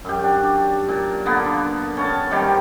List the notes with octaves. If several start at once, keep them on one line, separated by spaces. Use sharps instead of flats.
F#2 G4
D4
A#2
D3 A#3 B3
C#4 C#5 A5
C3 D#3 G3 G4